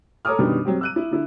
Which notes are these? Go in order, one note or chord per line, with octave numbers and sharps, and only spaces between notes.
A4 C#5 A#5 D6 D#6 F6
F#2 B2 D3 D#3 G3
F#3 C4 G4
E6 F#6 D#7
E4
D3 E4